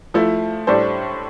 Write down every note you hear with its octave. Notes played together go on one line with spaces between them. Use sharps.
F3 A3 E4
A2 G3 D4 A4 C5